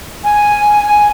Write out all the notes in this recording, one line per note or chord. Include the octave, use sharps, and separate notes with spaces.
G#5